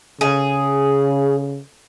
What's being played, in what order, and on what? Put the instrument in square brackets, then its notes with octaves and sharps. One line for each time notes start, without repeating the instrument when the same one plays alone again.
[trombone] C#3 [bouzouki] G#4